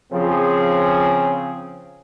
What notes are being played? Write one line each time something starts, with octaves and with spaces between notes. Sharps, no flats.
C#3 F3 C4 G#4